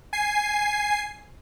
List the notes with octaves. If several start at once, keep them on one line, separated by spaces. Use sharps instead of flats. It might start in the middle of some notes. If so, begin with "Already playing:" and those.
G#5 C7